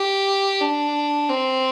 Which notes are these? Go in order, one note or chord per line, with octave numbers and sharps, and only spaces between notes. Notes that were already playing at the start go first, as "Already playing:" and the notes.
Already playing: G4
D4
C4